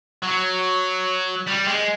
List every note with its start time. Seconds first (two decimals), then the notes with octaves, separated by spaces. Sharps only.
0.22 F#3
1.47 G3
1.67 G#3